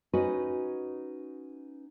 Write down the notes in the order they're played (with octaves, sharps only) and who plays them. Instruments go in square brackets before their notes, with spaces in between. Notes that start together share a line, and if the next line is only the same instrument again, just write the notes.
[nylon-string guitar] C#4 D#4 F#4 B4 C5 D#5